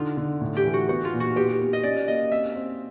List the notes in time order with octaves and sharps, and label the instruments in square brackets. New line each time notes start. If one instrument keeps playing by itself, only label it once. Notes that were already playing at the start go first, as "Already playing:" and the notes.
Already playing: [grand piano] D3 [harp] D#4 F4
[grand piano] D3
A2
[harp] G4
[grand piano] E3
[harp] F#4
[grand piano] B3 [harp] F#4
[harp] F4
[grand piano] A#2
[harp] F#4
[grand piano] B3 [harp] G4
[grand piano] B3
[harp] D#5
[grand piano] C#4 [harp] D5
[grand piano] A#3 [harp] D#5
[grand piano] C4 [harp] E5
[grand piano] C4